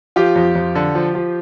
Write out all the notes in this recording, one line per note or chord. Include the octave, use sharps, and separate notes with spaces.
F3 F4 G4
F2
F2
D3
F3
F3